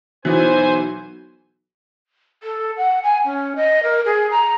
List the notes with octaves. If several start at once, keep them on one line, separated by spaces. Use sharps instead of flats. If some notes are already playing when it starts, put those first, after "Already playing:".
B1 E3 F#3 B3 C5 G#5
A4
F#5
G#5
C#4
D#5
A#4
G#4
A#5